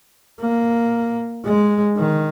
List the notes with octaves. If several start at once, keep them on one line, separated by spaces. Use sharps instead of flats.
A#3
G#3
D#3